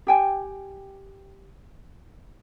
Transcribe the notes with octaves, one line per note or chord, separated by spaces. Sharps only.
G4 G5 G#5